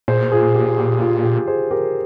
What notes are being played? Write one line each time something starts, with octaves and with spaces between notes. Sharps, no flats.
A#2 G#4 C5
F4 G#4
G4
G4
F4
G4
G#4 C5
G4 A#4